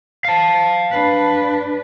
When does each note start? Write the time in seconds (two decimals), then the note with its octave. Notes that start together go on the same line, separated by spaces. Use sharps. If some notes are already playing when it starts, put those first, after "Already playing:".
0.25 F5 A5
0.91 D4 B4